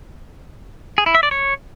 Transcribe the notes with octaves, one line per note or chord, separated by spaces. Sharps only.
G#4
E4
E5
D5
C#5